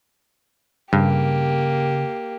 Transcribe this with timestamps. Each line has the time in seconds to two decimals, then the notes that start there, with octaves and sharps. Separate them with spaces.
0.93 G2 C#3 A#3 G4